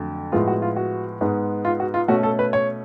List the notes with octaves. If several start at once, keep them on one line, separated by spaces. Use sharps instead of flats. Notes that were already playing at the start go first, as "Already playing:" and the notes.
Already playing: F2 D3 F#3 A3
A2 F3 G#3 B3 F4
F#4
F4
F#4
G#2 G#3 B3
F4
F#4
F4
B2 A3 C#4 F#4
A4
B4
C#5